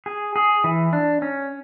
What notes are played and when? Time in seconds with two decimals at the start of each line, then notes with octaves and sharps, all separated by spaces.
0.06 G#4
0.36 G#4
0.64 E3
0.93 D4
1.22 C#4